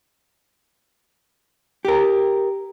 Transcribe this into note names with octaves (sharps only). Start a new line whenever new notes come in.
G4 A#4